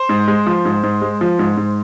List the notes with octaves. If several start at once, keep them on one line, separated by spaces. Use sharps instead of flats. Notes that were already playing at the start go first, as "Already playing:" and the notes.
Already playing: C5
G#2
G#3
F3
G#2
G#2
G#3
F3
G#2
G#2